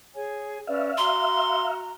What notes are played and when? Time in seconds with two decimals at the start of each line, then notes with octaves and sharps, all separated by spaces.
0.15 G#4 C#5 G#5
0.67 C#4 B4 D5 E5 F5
0.97 F#4 A#5 C6